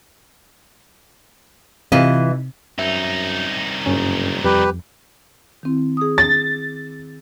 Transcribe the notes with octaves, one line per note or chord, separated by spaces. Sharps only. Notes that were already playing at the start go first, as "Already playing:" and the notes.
C3 E3 F4 D#5
C2 F#2 D#4 E5
F#1 G2 C#4
F2 G3 G4 B4
D#3 C4 E4
G#4 D#6
A6